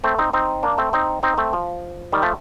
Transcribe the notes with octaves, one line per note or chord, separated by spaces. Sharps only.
A3 C4
C4 D#4
C4 D#4
A#3 D4
A3 C4
C4 D#4
C4 D#4
A3 C4
F3
D#3 G3
F3 A3